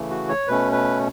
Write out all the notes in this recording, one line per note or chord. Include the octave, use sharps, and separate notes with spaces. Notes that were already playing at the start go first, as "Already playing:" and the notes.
Already playing: C#3 E3 A3
F#4
C#5
B2 A3 C#4 B4
B4